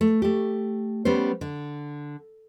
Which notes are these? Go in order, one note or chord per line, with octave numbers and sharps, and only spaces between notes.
A3
A3 G4
G3 B3 C#4 C5
D3